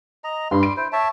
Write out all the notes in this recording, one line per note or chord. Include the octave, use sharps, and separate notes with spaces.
D#5 A#5
G2 G3 C6
D7
E4 C5
C#5 E5 A5